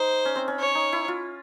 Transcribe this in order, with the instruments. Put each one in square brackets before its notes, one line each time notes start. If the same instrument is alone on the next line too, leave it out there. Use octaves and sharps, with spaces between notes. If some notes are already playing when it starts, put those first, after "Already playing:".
Already playing: [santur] D#4 [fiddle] C5
[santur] C#4
C4
C#4
[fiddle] C#5
[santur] D#4
E4
F4